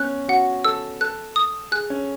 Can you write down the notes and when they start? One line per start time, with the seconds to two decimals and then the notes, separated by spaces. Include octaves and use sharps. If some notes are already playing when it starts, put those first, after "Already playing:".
Already playing: B3 C#4 F#6
0.28 F#4 F#5
0.65 A4 E6
1.01 A4 F#6
1.36 D#6
1.72 G#4 F#6
1.90 C#4